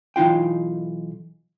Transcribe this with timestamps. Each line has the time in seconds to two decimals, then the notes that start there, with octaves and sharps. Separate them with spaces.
0.16 B1 E3 D#4 F4 G5